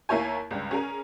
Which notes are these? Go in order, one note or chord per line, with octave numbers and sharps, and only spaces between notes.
D#2 A#3 E4 C#5 G#5
C#2 G2
C#4 G#4 A#4